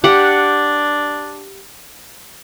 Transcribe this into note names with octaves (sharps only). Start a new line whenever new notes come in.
D4 G4 F#5